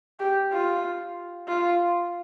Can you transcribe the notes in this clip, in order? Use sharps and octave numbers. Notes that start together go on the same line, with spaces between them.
G4
F4
F4